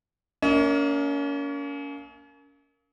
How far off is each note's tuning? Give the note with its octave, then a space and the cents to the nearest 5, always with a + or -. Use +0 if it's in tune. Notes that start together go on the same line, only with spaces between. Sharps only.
A#3 -5 C#4 +35 D#5 +45